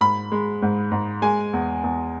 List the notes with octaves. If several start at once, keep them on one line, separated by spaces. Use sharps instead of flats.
G#2 B5
G#3
G#2
G#2
G#3 G#5
E2
E2